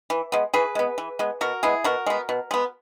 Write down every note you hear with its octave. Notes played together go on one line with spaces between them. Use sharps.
E3
G#3 B3
E3 G#4 B4
G#3 B3
E3
G#3 B3
B2 F#4 A#4
G#3 B3 E4 G#4
B2 F#4 A#4
G#3 B3
B2
G#3 B3